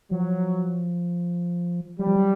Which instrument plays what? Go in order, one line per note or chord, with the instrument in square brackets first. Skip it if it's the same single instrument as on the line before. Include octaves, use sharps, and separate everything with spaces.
[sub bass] F3 [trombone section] F#3
[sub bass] F#3 [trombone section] G3
[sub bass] F3
F#3